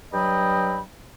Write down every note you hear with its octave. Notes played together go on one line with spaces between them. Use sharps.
G2 F#3 D#5 G5 B5